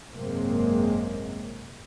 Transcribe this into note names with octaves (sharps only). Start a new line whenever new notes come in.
G#1 F#2 C3 G#3 A#3 C4